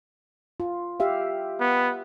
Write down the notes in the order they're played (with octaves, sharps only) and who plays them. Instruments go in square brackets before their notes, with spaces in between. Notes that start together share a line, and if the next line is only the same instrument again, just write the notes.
[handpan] F4
G4 E5 F5
[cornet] B3